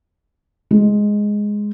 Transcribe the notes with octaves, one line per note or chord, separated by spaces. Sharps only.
G#3